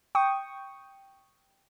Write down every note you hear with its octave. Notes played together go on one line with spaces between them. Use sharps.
G5 C#6 D#6